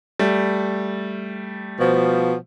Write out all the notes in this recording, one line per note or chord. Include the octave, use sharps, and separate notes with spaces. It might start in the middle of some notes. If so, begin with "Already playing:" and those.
G3 A3
B2 F3